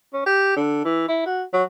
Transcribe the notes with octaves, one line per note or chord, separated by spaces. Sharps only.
C#4
G4
D3
E3
E4
F#4
F#3